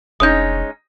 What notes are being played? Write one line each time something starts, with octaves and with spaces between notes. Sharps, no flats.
F1 G#3 C#4 D#4 D#6 G6